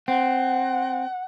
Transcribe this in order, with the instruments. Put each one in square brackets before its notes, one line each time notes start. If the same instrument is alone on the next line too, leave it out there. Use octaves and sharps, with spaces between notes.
[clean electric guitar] C4 [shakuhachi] F#5